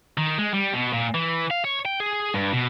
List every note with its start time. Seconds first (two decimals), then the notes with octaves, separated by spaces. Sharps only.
0.17 D#3
0.38 G#3
0.53 G3
0.73 B2
0.93 A#2
1.14 E3
1.50 F5
1.64 C#5
1.85 G5
2.00 G#4
2.34 G2
2.53 B2